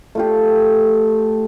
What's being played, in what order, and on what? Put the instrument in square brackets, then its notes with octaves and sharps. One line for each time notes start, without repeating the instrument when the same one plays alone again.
[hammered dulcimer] A3 F4 G4